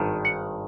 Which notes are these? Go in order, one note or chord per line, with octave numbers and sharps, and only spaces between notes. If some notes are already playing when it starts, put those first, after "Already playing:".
Already playing: G#1 G2 D#3
F#5